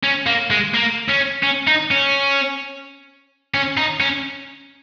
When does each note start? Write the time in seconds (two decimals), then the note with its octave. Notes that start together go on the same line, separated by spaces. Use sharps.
0.03 C#4
0.26 A#3
0.50 G#3
0.74 A#3
1.08 C#4
1.43 C#4
1.67 D#4
1.91 C#4
3.54 C#4
3.77 D#4
4.01 C#4